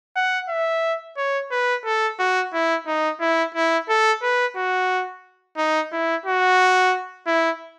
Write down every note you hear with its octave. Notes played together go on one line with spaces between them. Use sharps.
F#5
E5
C#5
B4
A4
F#4
E4
D#4
E4
E4
A4
B4
F#4
D#4
E4
F#4
E4